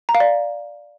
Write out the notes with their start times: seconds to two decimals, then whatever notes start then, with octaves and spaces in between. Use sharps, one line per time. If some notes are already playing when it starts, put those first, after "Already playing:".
0.09 A#5
0.15 F5
0.20 D5